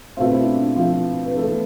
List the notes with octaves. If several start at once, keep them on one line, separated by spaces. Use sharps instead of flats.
B2 A3 C4 F4
E4
D4
E4
F3 F4
B4
E3 A3 B3 A4